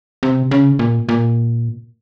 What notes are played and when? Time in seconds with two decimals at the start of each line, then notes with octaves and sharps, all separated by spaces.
0.23 C3
0.51 C#3
0.79 A#2
1.09 A#2